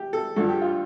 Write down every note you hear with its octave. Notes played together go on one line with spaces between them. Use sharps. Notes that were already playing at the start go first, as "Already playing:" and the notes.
Already playing: G4
A4
G2 D3 F3 A4
G4
F4